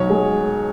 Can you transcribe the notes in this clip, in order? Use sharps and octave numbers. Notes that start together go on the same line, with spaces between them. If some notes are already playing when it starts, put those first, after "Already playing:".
Already playing: B1 C#5
G#3